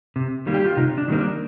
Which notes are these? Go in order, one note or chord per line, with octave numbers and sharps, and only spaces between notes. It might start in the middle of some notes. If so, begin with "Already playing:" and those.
C3
D#3 G3 A#3
G4
F4
C3 D#4
D4
D#3 G3 A#3 C4
D4